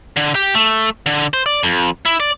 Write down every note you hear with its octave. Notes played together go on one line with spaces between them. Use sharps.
D3
G4
A3
D3
C5
D5
F2
E4
D5